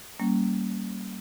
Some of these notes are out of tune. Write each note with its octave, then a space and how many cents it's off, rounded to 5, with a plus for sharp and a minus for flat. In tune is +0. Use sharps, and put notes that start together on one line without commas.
G3 -25 A#3 -15 C#4 +0